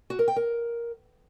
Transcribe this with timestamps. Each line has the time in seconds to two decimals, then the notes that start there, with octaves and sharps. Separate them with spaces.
0.10 F#4
0.19 A#4
0.28 G5
0.36 A#4